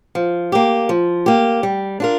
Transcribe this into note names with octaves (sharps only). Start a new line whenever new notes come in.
F3
A#3 G4
F3
A#3 G4
G3
D4 F4 A#4